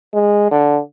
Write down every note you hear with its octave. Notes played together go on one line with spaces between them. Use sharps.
G#3
D3